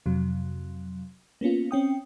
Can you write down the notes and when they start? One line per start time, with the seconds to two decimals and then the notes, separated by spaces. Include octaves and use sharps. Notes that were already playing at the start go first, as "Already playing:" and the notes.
0.06 F2 C3 F#3
1.41 A#3 B3 C#4 F4
1.71 C4 C#4 G5 D#6